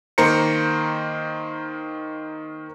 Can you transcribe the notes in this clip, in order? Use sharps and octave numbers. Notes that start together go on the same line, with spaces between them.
D#3 A#3 C5 A#5 C#7